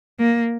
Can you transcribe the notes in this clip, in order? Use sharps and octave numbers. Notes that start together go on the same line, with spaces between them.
A#3